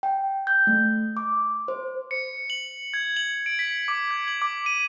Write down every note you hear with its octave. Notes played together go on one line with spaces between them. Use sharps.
G5
G6
A3
D6
C5
C#7
F#7
G#6
F#7
D7
B6
D6
G#6
F#7
D6
D#7